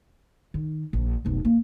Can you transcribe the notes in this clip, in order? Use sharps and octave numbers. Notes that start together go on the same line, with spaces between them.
D#3
A#1
F1 B1
A#3